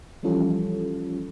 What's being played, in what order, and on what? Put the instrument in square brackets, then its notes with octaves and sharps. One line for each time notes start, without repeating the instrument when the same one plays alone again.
[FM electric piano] E3 F3 G3 C#4 F4 A4